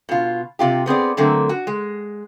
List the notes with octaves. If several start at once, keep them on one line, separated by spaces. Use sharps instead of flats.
B2 F4
C3 F4 G4
B3 C4 G#4 D5
D3 F#3 A3 A#3 C4
F#4
G#3